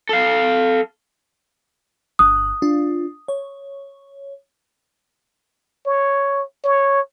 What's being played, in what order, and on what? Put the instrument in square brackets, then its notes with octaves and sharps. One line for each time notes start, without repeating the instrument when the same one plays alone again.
[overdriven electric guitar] A4 F5
[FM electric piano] G1 F#6 [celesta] D#6
[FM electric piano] D4 F4
C#5
[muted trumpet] C#5
C#5